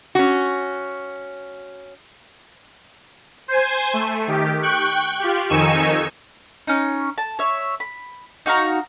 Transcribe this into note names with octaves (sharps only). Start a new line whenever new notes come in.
C#4 F#4
C5 G#5
A3
D#3 G4
G5 C#6 F#6
F4 G4
F2 D#3 D#4 G#5 C#6 E6
C#4 D#4
A5
C#5 E5
B5
D#4 F#4 F5 A#5